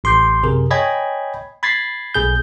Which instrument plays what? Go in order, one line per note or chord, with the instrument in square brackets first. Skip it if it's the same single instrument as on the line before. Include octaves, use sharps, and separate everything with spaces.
[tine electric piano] A1 C6 D6 G6
F#2 C3 G#4 A#4
C#5 D#5 G5 G#5 B5 G#6
B5 G#6 A6 B6 C7
B1 B2 G#4 G6